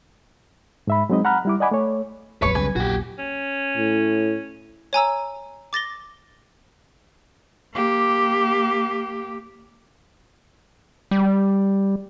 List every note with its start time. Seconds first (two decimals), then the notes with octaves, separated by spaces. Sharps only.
0.87 G#2 E5 B5
1.10 F#3 G#3 C4 D#4 D#5
1.25 F#5 A#5 B5 F6 F#6
1.45 G3 E4 D6
1.60 D5 D#5 F#5 G#5 B5 D6
1.71 A3 C#5
2.42 D#1 A1 E2 G2 F#3 B4 C#5 C#6
2.55 C2 C#3 G3 G#5
2.76 A#1 A#2 F#4 G4
3.19 C#4
3.77 A2
4.93 C#5 G#5 A#5 E6
5.73 D6 A6 A#6 G7
7.74 A#3 G4
11.11 G3